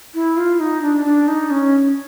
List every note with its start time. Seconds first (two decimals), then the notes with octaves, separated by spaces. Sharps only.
0.15 E4
0.37 F4
0.59 D#4
0.82 D4
1.05 D4
1.28 D#4
1.50 C#4